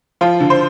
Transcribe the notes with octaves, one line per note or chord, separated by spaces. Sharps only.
F3 F4
D3
C5